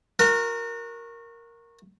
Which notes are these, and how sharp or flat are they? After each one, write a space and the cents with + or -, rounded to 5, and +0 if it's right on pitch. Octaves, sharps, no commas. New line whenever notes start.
F#4 -25 A#4 +0